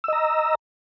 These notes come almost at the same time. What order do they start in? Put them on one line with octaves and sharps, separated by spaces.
E6 D#5 A#5